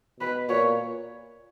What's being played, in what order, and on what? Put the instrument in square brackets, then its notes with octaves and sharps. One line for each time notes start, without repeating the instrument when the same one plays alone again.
[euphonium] B2 [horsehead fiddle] B4
[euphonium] A#2 [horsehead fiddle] C#5